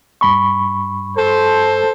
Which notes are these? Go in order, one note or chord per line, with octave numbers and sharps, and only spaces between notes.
G2 B5 C#6
A4 C5